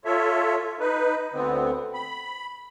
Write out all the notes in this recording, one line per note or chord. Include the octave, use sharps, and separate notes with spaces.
F4 A4 C#5 E5
D#4 B4
D2 D3 B3 C4
B5